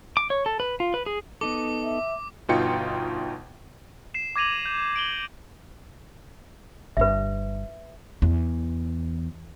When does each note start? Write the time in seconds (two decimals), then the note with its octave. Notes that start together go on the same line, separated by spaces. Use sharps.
0.17 D6
0.30 C#5
0.46 A4
0.60 B4
0.80 F4
0.94 B4
1.06 G#4
1.41 B3 D#4 A4 D6
1.84 E5
2.49 G1 B2 D#4 F4 G5 C#7
4.14 C7 E7
4.36 D6 G#6 A#6 D#7 F7 F#7
4.66 G6
4.96 D7 F#7 G7
6.97 G1 G2 B4 E5
8.22 E2